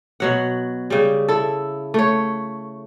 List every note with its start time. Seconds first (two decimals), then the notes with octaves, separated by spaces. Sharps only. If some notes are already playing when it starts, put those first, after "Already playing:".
0.20 B2 F#3 F#5
0.90 C#3 G3
1.28 E4 A4
1.94 A3 C#5